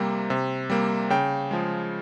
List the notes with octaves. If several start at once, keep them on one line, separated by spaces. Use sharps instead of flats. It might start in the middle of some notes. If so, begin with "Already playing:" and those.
Already playing: C3 G3 A#3
C3
G3 A#3
C#3 G5
F3 G#3